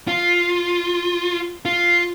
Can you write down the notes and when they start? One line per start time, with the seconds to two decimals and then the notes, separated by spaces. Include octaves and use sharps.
0.08 F4
1.65 F4